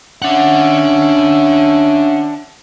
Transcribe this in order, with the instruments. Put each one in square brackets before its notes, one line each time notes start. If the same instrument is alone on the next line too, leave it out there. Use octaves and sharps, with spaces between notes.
[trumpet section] C#4 E5 [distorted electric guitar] D4 F#5